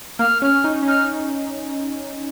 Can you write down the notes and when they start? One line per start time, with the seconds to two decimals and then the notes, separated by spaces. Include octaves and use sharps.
0.19 A#3 F6
0.42 C#4 F6
0.64 D#4
0.82 C#4
0.87 D#4 F6